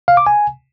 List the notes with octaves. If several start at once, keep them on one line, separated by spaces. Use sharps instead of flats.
F5
D6
G#5